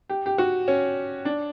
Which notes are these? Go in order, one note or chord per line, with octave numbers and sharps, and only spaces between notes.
G4
G4
F#4
C#4
D4